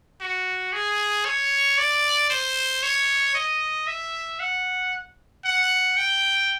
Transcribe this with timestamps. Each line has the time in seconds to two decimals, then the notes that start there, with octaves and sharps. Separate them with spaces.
0.21 F#4
0.73 G#4
1.25 C#5
1.78 D5
2.30 C5
2.83 C#5
3.35 D#5
3.87 E5
4.40 F#5
5.45 F#5
5.97 G5